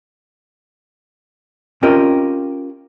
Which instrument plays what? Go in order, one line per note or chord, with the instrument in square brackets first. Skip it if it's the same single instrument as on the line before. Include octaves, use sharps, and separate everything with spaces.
[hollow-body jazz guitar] C4 C#4 F4 G4 A#4 D#5